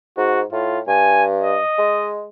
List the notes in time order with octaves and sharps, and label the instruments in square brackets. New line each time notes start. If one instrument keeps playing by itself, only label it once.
[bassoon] G#2 [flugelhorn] F#4
[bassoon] A2 [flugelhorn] F4
[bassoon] G2 [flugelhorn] G#5
[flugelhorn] D#5
[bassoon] G#3